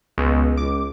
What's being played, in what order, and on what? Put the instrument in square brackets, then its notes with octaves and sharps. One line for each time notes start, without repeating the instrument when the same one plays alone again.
[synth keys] C#2 [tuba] B2
[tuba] C#2 [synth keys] D6